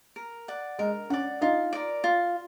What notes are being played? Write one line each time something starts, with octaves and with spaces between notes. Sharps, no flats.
A#4
D5 F#5
G#3 A#4
C#4 D5 F#5
D#4 F4
A#4 D5
F4